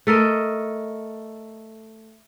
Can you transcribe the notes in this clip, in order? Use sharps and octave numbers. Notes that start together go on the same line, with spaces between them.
A3 A4 A#4 D#5